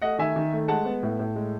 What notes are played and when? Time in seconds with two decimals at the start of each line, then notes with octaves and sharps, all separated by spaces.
0.02 A3 D#5 F#5
0.19 D#3 E5 G#5
0.36 D#3
0.53 A3
0.68 G#3 F#5 A5
0.85 B3
1.03 A2
1.19 A2
1.36 G#3